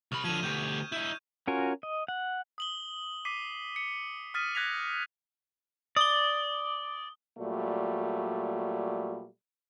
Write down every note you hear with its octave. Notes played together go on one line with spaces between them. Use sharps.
C2 B5 C#6 D#6 F6
D3 F3 G#6 D#7 E7
D2 G4 G6
E4 D#5 G6
C#4 F4 F#4 A#4 G#5
D#5
F#5
D#6 F#7 G7
D6 B6 C7 D#7
C#7
D#6 F6 A6 B6 D#7
F#6 G#6 A#6 B6 F7
D5 D#6 G7
A#2 F#3 G3 A3